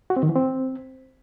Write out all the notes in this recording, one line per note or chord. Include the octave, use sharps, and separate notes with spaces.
F#4
C4
D#3
E3
C4